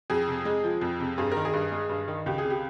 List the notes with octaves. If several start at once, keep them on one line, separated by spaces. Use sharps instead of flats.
F2 G#4
C3
G#3
F3
F2
C3
G2 G#4
D#3 A#4
G#4
G2
G#3
G2
D#3
C#2 G4
G#4
C3
G4